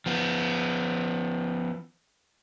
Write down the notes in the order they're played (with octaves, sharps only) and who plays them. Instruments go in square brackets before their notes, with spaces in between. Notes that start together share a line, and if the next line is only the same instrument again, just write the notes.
[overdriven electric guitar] F3 B3